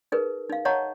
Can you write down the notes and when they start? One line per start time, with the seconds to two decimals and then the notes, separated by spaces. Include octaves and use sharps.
0.12 D#4 G#4 A#4 B4
0.50 D#4 F5
0.65 C#5 D#5 F#5 A5 A#5 C#6